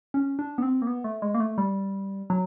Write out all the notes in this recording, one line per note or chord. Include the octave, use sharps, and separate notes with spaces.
C#4
D4
B3
C4
A#3
B3
A3
G#3
A#3
A3
G3
F#3